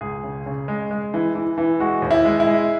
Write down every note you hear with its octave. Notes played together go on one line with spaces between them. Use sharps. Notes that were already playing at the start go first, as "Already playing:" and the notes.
C#2 G#4
C#3
C#3
G#3
G#3
E3
E3
E3
G#3 F#4
D#2
E4
G#3
E4
G#3